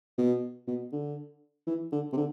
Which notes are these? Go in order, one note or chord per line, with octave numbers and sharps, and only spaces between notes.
B2
B2
D3
E3
D3
C3
D3